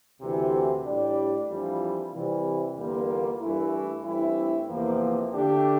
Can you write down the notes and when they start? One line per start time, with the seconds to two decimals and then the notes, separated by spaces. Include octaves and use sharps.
0.21 D2 C3 E3
0.85 A2 G3 D4 G4 D5
1.49 F2 E3 G3 D4 F4
2.13 C3 E3 G3
2.77 E2 D3 G3 A#3 F4
3.40 G2 E3 A3 E4
4.04 G2 E3 A3 C4 E4
4.69 E2 C3 F3 A#3
5.33 D3 A3 D4 G4